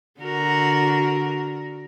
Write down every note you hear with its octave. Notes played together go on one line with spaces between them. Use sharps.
D3 F#4 A#4